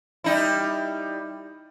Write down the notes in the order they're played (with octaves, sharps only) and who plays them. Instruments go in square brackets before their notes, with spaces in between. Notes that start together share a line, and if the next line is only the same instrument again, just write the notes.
[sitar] G3 D#4 E4